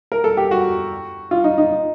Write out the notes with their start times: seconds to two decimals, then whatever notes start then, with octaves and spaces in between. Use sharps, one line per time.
0.12 A#4
0.24 A4
0.37 G4
0.51 F#4
1.31 F4
1.44 D#4
1.58 D#4